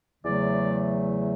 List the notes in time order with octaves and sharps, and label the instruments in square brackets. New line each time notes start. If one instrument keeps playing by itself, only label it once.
[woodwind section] E2 C#3 F#3 A3 D5